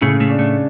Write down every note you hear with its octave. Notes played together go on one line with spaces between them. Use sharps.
A2 C#3 A3
A2 A3
D4
A2 A3